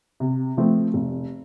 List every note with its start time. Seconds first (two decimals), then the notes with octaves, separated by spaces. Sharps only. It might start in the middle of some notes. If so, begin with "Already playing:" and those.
0.20 C3
0.57 F3 A3 C4
0.94 F1